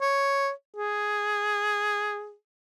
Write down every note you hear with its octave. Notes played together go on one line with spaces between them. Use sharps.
C#5
G#4